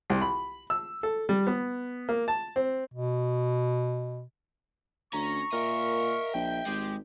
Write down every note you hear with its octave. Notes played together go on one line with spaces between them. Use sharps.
C2
B5
E6
A4
G3
B3
A#3
A5
C4
B2
D2 C#4 A#5 C#6
A#2 A#4 D#5 E5
A#1 G5
G#1 G#3 G4